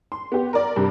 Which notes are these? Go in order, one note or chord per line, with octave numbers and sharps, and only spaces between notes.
C6
B3 G4
A#4 D5
G2 C3